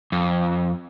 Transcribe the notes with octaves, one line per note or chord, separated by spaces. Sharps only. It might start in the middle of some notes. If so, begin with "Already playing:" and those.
F2